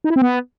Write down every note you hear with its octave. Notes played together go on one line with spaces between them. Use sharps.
D#4
E4
C4
B3